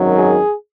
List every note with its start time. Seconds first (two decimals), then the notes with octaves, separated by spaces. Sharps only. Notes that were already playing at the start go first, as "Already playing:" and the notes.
Already playing: G#1 F#2 D#3 F#3
0.17 G#4